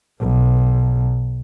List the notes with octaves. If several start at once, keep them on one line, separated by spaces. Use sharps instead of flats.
B1